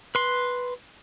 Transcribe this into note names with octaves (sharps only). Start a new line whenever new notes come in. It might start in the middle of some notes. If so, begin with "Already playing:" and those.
B4 C6